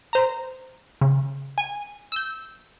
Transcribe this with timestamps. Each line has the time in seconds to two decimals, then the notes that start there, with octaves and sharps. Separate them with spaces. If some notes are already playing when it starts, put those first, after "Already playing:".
0.13 C5 A#5
1.01 C#3
1.58 G#5
2.12 E6 G6